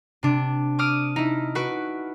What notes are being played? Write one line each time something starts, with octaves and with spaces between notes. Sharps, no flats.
C3 D4
D6 D#6 F6 D7 D#7
D#4 E4
F#4 B4 D7